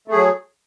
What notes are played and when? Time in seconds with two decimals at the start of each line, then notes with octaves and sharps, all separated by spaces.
0.08 A3
0.11 G#4
0.15 F#3